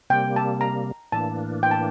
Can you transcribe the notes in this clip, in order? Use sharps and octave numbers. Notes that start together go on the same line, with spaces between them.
C3 G3 A#3 G5
A5
A#5
A2 E3 A#3 D4 A5
G5
A5